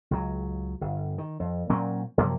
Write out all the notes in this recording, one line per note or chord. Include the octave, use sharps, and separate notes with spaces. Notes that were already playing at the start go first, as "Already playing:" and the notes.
C#2 F#3
G1
D#3
F2
A#2 F#3 C4 C#4
F#2 C3 F3 A#3